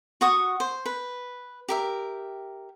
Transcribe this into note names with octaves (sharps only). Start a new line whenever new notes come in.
F#4 F#5 C#6 D#6
C5
B4
G4 A#4 E5